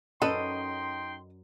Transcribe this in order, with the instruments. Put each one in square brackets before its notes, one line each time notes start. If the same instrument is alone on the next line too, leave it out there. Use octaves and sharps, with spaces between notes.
[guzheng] F#2 C#4 [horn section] D#4 G5 C6 [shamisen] A4 B4 [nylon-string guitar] D#5